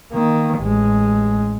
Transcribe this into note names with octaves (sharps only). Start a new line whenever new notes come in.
D#3 A#3
A1 G#3